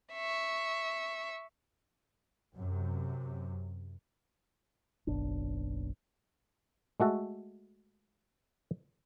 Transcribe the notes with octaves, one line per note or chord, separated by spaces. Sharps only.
E5 C#6
F#2 C3
F#1 B1 D4
G#3 A3 F#4 A4